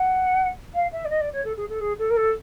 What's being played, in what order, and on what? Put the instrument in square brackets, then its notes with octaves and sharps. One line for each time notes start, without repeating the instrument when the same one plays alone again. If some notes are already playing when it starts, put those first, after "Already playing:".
Already playing: [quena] F#5
F5
E5
D5
D#5
D5
C#5
A4
G#4
A4
G#4
A4
A#4
A4